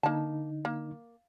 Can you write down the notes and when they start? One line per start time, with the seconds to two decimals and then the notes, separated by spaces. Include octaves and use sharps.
0.03 D3 A#3 D#4 A5
0.65 A#3